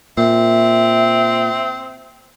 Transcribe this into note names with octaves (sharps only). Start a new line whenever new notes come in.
A#2 C4 E5